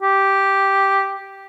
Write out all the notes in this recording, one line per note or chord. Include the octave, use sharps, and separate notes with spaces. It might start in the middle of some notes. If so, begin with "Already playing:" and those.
G4